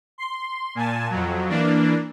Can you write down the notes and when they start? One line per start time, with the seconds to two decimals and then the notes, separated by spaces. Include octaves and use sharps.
0.18 C6
0.75 A#2 G#5 A5
1.10 F2 F#3
1.49 E3 A#3 D4